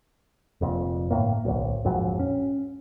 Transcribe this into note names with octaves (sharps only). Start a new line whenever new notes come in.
F1 F2 A#2
G1 A2 A#3
D1 B1
A#1 F2 G#2 F#3
C#4